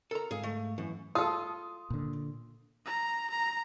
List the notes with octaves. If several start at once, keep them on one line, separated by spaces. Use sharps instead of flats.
A4 A#4 A#5
G#2 G#3 G#4 F5
A3
F#2 E3
F4 A4 D#6
A#2 D3
A#5
A#5